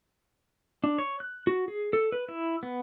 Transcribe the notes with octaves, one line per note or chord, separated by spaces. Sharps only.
D4
C#5
F#6
F#4
G#4
A4
B4
E4
B3